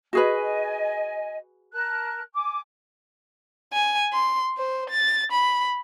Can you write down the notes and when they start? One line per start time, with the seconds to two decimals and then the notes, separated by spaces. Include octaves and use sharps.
0.13 F#4 G#4 B4 D#5 G#5
1.73 A#4 A5 F#6
2.34 G#5 D6
3.73 G#5
4.13 C6
4.58 C5
4.90 A6
5.32 B5